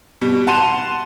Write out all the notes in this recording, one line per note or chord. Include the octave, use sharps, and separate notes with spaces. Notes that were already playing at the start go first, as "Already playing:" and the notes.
B2 G3
F#5 A5 C6 D#7 F7